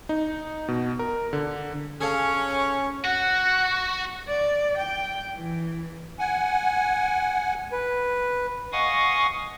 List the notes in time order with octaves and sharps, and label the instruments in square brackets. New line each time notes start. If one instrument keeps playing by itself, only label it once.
[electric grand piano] D#4
B2
A#4
D3
[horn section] C#4 [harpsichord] G#4 A4 F5
[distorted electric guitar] F#4 [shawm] F#5
[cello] D5
G5
E3
[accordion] F#5 G#5
[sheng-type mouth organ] B4
[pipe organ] D#5 F5 F#5 G#5 C#6 D#6